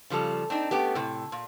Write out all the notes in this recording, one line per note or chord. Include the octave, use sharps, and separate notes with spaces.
C#3 F3 G3 A4
C4 D4 D#4
A3 B3 C#4 G4
A2 C3
A#2